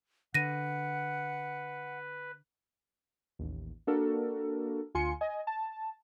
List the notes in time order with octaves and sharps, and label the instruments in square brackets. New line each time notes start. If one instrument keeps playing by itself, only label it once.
[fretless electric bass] D3 [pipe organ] B4 [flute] F#5 [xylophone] A#6 D#7
[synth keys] A1 D#2
A#3 D4 F#4 A4 A#4
D2 F4 G#5 C6 C#7
D#5 G#5
A5